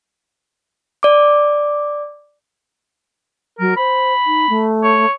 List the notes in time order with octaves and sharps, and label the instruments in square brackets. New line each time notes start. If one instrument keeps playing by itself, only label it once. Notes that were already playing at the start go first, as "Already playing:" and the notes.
[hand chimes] D5 D6
[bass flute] F#3 [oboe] A#4
[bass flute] C5 [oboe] B5
[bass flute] D#4
A3
[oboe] C#5